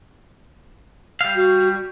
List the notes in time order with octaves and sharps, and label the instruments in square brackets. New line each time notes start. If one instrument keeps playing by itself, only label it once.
[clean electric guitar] G3 F5
[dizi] F#4